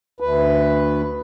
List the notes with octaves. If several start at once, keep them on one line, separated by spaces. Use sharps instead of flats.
D2 B4